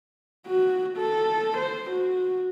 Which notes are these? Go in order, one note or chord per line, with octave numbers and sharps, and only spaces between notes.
F#4
A4
C5
F#4